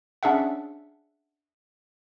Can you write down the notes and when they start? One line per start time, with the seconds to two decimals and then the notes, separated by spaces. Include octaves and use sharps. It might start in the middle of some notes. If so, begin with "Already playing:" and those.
0.23 C#4 D4 G#4 E5 F#5